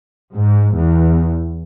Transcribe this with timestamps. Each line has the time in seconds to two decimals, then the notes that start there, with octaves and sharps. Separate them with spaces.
0.35 G#2
0.75 E2